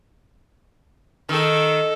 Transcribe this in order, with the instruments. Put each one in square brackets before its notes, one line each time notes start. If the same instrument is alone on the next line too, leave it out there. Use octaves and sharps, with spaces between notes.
[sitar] D#3 [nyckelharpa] A4